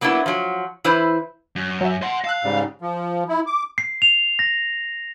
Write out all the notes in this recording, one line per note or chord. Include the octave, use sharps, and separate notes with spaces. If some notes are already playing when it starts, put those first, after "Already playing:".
F#3 A#3 B3 D4 E4
F3 F#3
E3 E4 B4 C5
F#2
F#3 E5
D#5 F#5 C6
F5 A5 E6 F#6
G#2 C#3 G3
F3
E4
D6
C7
F7
A#6